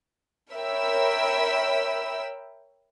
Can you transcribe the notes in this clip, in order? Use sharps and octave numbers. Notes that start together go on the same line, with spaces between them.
A#4 C#5 E5 G5 B5 E6